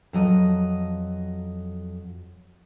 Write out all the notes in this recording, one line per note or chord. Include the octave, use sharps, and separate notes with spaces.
F2 F#3 D#5